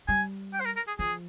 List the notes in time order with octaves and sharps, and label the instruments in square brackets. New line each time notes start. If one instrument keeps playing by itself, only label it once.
[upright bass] G3 [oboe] G#5
[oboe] G5
C5
A#4
A#4
G#4
[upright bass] F3 [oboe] G#4